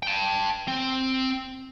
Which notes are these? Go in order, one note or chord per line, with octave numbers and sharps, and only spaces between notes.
G5 A5
C4